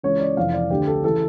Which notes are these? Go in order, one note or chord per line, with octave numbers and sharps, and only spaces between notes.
C#2 C#3 E3 C#5
D5
F1 F2 E3 F5
D5
D2 D3 G4
A4
C#3 E3 A4